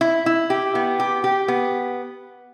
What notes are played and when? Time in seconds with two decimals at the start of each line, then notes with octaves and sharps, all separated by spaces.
0.01 E4
0.26 E4
0.50 G4
0.75 B3
1.00 G4
1.24 G4
1.48 B3